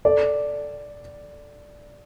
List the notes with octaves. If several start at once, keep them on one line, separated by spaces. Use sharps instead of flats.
A4 D5